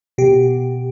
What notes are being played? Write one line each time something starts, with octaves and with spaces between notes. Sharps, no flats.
B2 G4